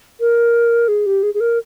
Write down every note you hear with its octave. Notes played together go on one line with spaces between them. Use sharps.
A#4
G#4
G4
G#4
G#4
A#4